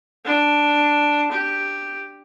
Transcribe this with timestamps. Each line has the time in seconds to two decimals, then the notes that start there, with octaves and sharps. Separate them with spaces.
0.25 D4
1.32 G4